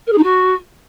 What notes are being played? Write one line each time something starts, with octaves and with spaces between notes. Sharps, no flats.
A#4
G#4
D#4
F#4